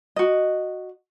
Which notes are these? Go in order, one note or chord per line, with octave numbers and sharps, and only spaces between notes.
F#4 D#5